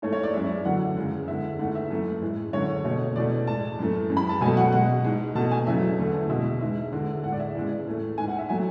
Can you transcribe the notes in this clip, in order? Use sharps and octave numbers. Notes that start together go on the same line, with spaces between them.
G#2 E3 A3 C#5
C#5
D5
F#2 E3 G#3 E5
E2 D3 F#3 F#5
F#2 C#3 E3 G#3
E2 D3 G#3 E5
G#2 E3 A3 F#5
E5
F#2 E3 A3
A2 E3 G#3
F#2 D3 G#3 C#5
B2 A3 C#5
E2 B2 A3 D5
A2 G#3 A5
F#2 E3 A3
F#2 E3 G#3
B5
A5
B2 F#3 A3 G#5
F#5
B2 G#3 F#5
G#2 G#3
B2 A3 A5
G#5
E2 C#3 F#3 A3 E5
E2 D3 A3
B2 G#3 E5
G#2 G#3 E5
E2 D3 G#3
A2 F#5
G#3 D5
E5
E2 C#3 G#3
A2 E3 A3
G#2 G#3 G#5
F#5
E5
F#3 A3 G#5